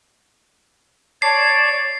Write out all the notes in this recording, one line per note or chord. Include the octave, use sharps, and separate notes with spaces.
C#5 D5 A5 C7